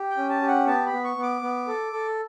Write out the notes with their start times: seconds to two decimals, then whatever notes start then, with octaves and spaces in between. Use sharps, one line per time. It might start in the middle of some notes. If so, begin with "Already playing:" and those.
Already playing: G4
0.10 G5
0.17 C#4
0.29 A5
0.42 G4
0.48 F#5
0.67 B3 A5
0.86 B5
0.93 B3
1.04 C#6
1.17 B3
1.23 D6
1.42 B3
1.67 A4
1.93 A4